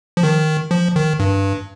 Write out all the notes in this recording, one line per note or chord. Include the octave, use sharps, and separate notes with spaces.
F3
D#3
F3
D#3
G2